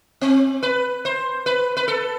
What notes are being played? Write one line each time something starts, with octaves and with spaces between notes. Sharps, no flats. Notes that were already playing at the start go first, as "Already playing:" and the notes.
C4
B4
C5
B4
B4
A4